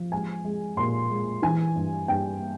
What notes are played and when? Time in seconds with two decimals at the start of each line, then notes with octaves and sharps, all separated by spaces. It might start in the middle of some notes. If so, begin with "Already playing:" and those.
Already playing: F3
0.12 G#3 G#5
0.45 G#3
0.77 A#2 C6
1.10 G#3
1.42 E3 G#5
1.76 G2
2.08 G2 G5